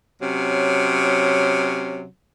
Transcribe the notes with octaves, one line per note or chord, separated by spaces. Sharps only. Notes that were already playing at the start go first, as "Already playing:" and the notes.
C3 F#3 C#4